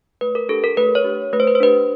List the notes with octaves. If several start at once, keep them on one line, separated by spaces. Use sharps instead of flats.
A3 B4
A#4
D4 G4 A4
A#4
A3 B4
C#5
D4 G4
A3 B4
C5
B4
C5
D4 G4 B4